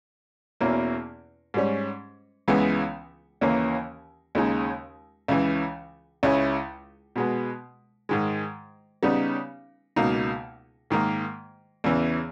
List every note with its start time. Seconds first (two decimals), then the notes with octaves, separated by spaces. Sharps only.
0.61 E2 B2 A#3 C#4 E4
1.54 G#2 G3 C#4
2.48 C#2 C#3 E3 G#3 B3
3.41 D#2 C#3 E3 A#3 C#4
4.35 D#2 C#3 G#3 D#4
5.28 C#2 C#3 E3
6.23 C#2 C#3 G#3 C#4 E4
7.16 B2 G#3 B3
8.09 G#2 D#3 G#3
9.03 C#3 G3 B3 D#4
9.96 C#2 B2 A#3 D#4
10.90 G#2 D#3 A#3
11.84 E2 C#3 E3